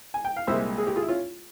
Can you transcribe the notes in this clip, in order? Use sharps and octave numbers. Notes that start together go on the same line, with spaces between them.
G#5
G5
F5
C2 A#2 G#3 C5 E5
G#4
G4
F4 G#4
E4
C#4 F4